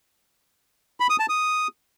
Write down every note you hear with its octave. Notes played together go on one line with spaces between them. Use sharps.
B5
D#6
A5
D#6